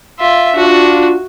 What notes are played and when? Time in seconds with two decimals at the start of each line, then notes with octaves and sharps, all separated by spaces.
0.19 F4 E5
0.56 D4 F4 F#4